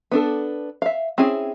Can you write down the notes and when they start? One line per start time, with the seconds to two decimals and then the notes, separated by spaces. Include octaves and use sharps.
0.11 B3 D4 A4
0.82 E5 F5
1.18 C4 C#4 E4 G#4